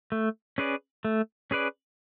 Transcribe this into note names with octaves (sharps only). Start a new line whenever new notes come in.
A3
C#4 G#4 B4 D5
A3
C#4 G#4 B4 D5